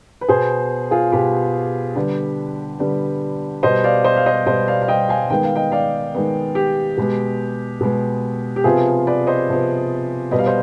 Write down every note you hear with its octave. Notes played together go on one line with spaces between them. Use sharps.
B4
B2 B3 G#4 C5
F4 G#4
B2 B3 G4 B4
D3 G3 B3
D3 G3 B3
B2 G3 B3 C5 D#5
D5 F5
C5 D#5
F5
C5 D#5
B2 G3 B3 C5 D#5
D5 F5
F5
D#5 G5
F5 G#5
D#3 G#3 B3 G5
F5
D#5 G5
D5 F5
D#3 G#3 B3
G4
B2 G#3 B3
B2 G#3 B3
G4
C3 F3 B3 F4 G#4
B4 D5
C5 D#5
C3 F3 B3
B2 G3 B3 D#5
F5
C5 D#5